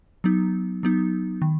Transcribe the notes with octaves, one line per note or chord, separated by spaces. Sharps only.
F#3 B3 D#4
F#3 B3 D#4
D#3